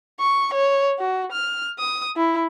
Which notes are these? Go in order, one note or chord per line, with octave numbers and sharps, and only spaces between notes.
C#6
C#5
F#4
F6
D#6
E4